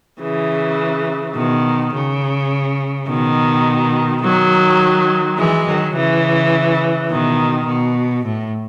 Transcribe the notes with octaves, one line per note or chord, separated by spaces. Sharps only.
C#3 E3
B2 D#3
C#3
B2 D#3
D#3 F#3
E3 G#3
D#3 F#3
C#3 E3
B2 D#3
B2
A2